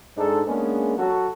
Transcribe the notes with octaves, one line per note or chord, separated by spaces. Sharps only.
G#2 G#3 D4 D#4 A4
G#3 A#3 B3 C#4 D4 G#4
F#3 F#4 A4